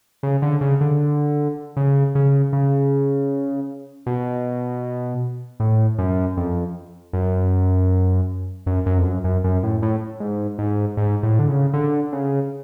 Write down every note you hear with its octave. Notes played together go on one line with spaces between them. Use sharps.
C#3
D3
C#3
D3
C#3
C#3
C#3
B2
A2
F#2
F2
F#2
F#2
F#2
F2
F#2
F#2
F#2
A2
A2
G#2
G#2
G#2
A2
D3
C#3
D3
C#3